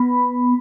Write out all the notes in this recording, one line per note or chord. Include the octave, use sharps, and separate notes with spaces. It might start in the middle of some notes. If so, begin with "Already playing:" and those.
Already playing: B3 B5